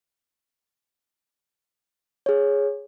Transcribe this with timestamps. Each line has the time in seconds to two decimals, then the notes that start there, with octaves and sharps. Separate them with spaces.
2.26 G#4 C#5